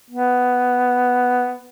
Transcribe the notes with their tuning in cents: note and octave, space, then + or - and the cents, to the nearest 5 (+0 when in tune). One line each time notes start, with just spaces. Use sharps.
B3 +5